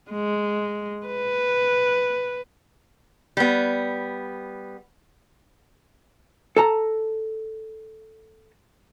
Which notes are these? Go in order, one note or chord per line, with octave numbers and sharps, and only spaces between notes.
G#3
B4
G3 B3
A4 A5 A#5